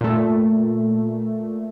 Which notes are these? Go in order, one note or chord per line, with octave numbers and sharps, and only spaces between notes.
A#2 A3